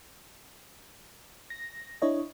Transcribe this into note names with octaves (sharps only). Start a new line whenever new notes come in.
A#6
D4 E4 C#5 D#5